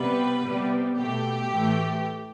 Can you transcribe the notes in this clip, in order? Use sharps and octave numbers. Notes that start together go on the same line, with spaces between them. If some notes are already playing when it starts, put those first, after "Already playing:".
Already playing: C3 G3 B3 B4
C3 G3 B3
B2 A3 G4
A2 E3 A3